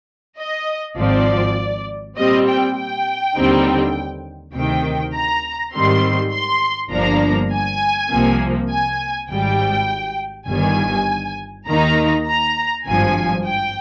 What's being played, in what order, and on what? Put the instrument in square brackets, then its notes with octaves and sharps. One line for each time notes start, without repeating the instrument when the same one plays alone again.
[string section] D#5
G#1 G#2 F3 C4 D5
A#2 G3 C4 D#5
G5
G5
D#2 D3 G3 C4 D#4
D2 C3 D#3 G5
A#5
G#2 D#3 G3 C4 C6
C6
G1 G2 F3 A#3 D4 A#5
G#5
C2 C3 F3 A#3
G#5
G#1 G#2 G3 G5
G1 G2 D#3 G3 G#5
D#2 D#3 A#3 D#4 A#5
A#5
G#1 G2 F3 G#5
G5